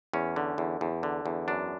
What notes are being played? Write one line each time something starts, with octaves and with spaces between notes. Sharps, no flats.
E2 C#4
D3
E2
E2
D3
E2
F#2 D4